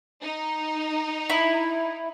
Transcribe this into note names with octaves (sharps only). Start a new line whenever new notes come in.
D#4
E4